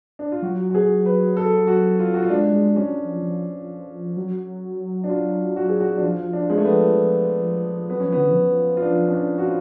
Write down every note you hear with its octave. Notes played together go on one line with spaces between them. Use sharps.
D4
F4
F#3 F#4
F#4
G#4
B4
A4
F#4
F4
F#4
F4
G#3 D4
G#3
F#3 C#4
F3
F3
F#3
D4
F4
F#4
G#4
F#4
D4
F3 F4
D4
G#3
A3
B3
F#3 B3
F3 C#4
D3 B3
F3
F4
D4
C#4
D4
F#4
F4